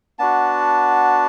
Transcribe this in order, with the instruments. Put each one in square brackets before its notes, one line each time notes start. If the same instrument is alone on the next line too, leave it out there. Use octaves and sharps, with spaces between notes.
[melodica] B3 D4 F#4 A5